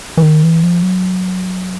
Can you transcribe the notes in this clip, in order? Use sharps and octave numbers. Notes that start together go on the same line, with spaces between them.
E3
D#3
E3
F3
F#3